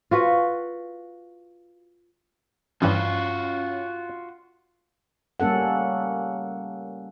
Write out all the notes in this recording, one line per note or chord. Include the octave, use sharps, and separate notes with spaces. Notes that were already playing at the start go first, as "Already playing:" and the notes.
F4 F#4 B4
G2 E3 F3 C#4 F4 F#4
G3 A#3 C#4 A4 F#5